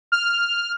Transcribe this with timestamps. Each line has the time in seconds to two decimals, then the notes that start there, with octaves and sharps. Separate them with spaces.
0.12 F6